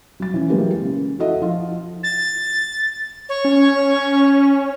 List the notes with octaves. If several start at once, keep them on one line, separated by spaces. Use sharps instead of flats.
F#3 A6
E3 C#4
E3 F#3 G#3 A#3 G4 B4
C#3
E4 F#4 A4 D#5 E5 F#5
F3 F4
A6
C#5
C#4